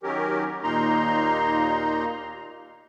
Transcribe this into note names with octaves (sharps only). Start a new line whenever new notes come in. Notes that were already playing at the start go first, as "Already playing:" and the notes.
D#3 F#3 C#4 G4 A#4
D#2 A#2 A#3 D#4 A#5 C6